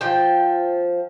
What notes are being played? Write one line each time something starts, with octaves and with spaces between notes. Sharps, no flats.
F3 G5